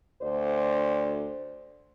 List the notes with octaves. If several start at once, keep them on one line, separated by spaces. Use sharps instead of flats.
D2 C5 D5